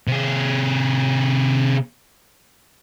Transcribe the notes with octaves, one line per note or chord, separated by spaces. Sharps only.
C3 G#4